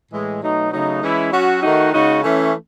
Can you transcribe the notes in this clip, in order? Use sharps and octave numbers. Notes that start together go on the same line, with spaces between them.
A2 E3 G#3
B2 F#3 A3 D#4
C#3 F#3 A3 D#4
E3 G#3 C#4 E4
F#3 C#4 F#4
D#3 A3 D#4 F#4
C#3 G#3 D#4 F#4
E3 A3 C#4